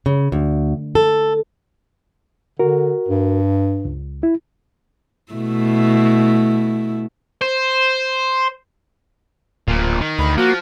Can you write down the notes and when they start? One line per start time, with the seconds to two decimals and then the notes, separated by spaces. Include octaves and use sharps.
0.06 C#3
0.32 D2
0.95 A4
2.60 D3 F#4 A#4
3.08 G2
3.85 C#2
4.23 E4
5.33 B2 A3 E4
7.42 C5
9.68 D1 A#2 F3
10.00 D#3
10.18 D2 B5
10.37 F3 A#3 F#4